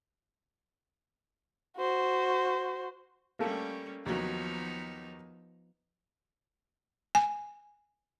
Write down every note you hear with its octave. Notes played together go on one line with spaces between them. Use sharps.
F#4 C5
G3 A3 A#3 C#4
D#2 F3 F#3 B3 D#4
G#5